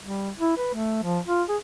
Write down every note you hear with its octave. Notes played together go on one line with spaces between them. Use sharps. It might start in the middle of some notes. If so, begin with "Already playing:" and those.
G3
E4
B4
A3
F3
F4
G#4